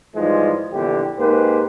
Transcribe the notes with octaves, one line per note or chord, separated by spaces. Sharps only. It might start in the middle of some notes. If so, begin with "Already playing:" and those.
G#2 E3 F3 G3 G#3
A#1 E2 D3 G4
G#2 A#3 G4 B4 C5